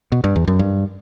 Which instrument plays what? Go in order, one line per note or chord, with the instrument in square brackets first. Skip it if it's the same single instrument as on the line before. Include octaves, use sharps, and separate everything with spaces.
[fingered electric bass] B2
G2
E2
F#2
G2